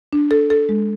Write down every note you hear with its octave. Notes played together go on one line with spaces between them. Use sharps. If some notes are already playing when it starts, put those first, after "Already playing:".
D4
A4
A4
G#3